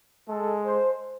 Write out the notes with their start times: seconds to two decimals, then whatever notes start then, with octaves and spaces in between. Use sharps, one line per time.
0.29 G#3 A4
0.66 C5